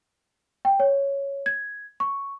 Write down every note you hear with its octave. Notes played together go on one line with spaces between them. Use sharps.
G5
C#5
G#6
C#6